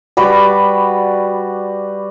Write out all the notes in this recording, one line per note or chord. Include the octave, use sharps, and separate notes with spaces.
G3 F#4 B4 D5